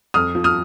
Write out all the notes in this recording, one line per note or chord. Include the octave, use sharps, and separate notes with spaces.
F2 D#6 F6
F3
D#6 F6